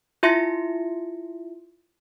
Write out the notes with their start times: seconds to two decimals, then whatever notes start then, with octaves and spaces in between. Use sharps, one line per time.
0.23 E4 F4 E5 C6 A#6 C#7